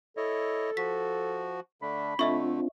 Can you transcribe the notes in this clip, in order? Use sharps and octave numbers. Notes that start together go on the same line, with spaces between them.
E4 A4 C#5 D#5
F3 F#4 B6
D3 A3 D4 B5
D3 A3 C4 D4 F4 D#5 E5 C#6